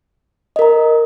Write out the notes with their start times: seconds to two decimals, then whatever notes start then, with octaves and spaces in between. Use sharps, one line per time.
0.56 D#5
0.59 A#4
0.62 A#5